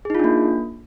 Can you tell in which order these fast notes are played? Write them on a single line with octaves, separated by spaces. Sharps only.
G#4 D#4 F4 D4 A#3